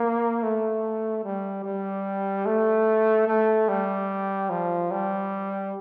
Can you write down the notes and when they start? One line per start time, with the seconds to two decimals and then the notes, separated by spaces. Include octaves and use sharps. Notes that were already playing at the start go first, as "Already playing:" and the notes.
Already playing: A#3
0.42 A3
1.24 G3
1.64 G3
2.46 A3
3.27 A3
3.69 G3
4.50 F3
4.91 G3